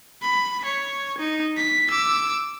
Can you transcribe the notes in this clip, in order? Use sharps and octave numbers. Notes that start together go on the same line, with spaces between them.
B5
C#5
D#4
B6
D6 E6